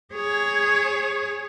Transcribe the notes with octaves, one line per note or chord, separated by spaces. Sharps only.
G#4 C#5